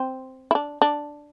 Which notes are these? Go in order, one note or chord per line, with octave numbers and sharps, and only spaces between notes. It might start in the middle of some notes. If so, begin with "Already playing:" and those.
Already playing: C4
E4
D4
D4